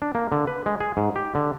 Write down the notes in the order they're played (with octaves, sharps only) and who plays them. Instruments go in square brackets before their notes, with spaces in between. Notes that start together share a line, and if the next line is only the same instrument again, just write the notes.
[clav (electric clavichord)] D4
A#3
D3
B4
G#3
G#4
G#2
G4
D3